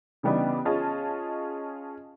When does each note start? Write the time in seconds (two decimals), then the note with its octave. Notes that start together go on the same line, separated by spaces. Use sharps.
0.23 C#3 E3 G3 B3 D4 D#4
0.65 C#4 F4 G#4 D#5 A5